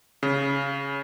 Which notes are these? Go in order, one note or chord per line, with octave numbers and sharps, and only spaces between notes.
C#3